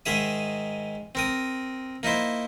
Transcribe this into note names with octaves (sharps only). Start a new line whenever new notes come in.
G#2 D#3 G#4 E5 D#6
C4 A#4 D#6
A#3 D#4 E4 C5